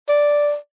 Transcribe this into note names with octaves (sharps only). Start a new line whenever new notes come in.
D5